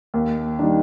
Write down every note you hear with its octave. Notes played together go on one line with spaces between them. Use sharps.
D#2
D#3 G3 D4